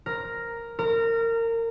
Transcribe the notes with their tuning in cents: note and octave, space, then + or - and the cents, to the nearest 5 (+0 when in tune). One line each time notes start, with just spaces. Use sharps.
A#4 +0
A#4 -25